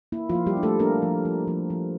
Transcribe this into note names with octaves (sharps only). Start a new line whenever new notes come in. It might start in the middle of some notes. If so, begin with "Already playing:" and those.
A#3 E4
F3 F4
A#3
G3 G4
D4
A3 A4
A#3 D4 A#4
F3
F3
F3
F3